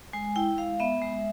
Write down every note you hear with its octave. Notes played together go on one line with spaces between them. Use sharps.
G#3 G#5
E4 G5
G#3 F5
B3 E5
G#3